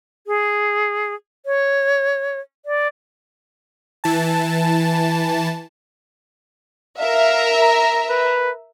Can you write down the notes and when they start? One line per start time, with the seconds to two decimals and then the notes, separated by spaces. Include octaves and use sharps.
0.27 G#4
1.46 C#5
2.66 D5
4.04 E3 A5
6.98 A#4 E5 F5
7.61 A#5
8.10 B4